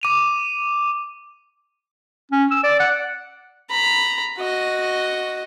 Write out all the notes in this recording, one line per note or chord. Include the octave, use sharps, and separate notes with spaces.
D6 D#7 F7
C#4
E6
D5
F#5
A#5 B5
F#4 D#5